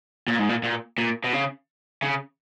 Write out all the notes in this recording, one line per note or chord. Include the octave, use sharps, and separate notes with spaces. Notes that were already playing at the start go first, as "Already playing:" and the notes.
A#2
G#2
A#2
A#2
A#2
B2
C#3
C#3